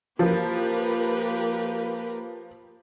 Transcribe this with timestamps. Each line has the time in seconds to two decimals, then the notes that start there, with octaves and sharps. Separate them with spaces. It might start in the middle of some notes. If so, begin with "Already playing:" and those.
0.19 F3 A#3 G4 A#4 B4